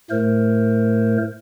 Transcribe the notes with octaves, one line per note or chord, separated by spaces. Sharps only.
A2 A3 A#4 C5